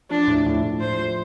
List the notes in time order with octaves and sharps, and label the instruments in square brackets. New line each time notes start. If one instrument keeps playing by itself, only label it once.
[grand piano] F3 [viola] D4
[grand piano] A2
A2
A2
[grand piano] F3 [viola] C5
[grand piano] F3